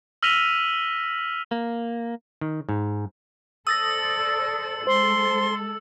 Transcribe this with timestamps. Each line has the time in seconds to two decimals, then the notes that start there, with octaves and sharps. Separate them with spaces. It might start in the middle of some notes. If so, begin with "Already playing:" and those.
0.23 E6 F6 A#6 B6 D#7 F7
1.51 A#3
2.41 D#3
2.69 G#2
3.67 A4 C5 D5 D#6 E6 A6 A#6
4.87 G#3 A4 C5 C6